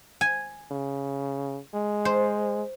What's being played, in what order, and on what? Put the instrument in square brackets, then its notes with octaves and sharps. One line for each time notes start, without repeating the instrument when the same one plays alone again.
[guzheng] G#5
[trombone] C#3
G#3
[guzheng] C5